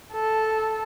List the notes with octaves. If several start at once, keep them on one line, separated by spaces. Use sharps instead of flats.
A4